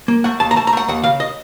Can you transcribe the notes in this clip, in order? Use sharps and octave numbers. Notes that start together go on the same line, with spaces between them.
A#3
A3 F#5
D#2 A5
A#5
A3 A5
A#5
A3 F#5
D#2 F#5
C#3 F5
D#5